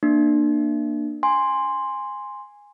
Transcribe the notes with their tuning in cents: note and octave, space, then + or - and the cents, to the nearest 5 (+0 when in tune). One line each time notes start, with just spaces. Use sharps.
A#3 +5 D4 +25
G#5 -10 C6 +0